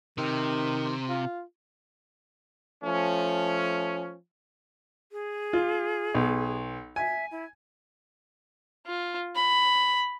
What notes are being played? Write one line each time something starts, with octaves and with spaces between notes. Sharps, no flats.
C3 D#3
F4
F3 A3 C#4
G#4
F4
B1
E5 G#5
E4
F4
B5